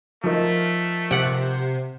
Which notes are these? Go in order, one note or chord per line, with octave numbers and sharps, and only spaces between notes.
F3 A3 D#4 A#4
C3 G4 F#5